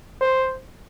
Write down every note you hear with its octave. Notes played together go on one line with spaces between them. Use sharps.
C5